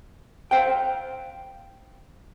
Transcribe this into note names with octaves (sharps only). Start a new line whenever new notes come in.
C5 F5 G5